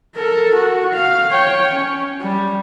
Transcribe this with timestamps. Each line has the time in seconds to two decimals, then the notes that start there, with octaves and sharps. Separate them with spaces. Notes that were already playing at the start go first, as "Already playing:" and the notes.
0.15 A4 A#4
0.54 F#4
0.93 F5
1.31 C#5 G5
1.73 C#4
2.21 G3